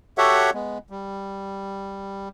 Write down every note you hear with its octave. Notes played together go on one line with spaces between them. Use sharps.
F#4 G4 A4 C#5 E5 F#5
G#3 B3
G3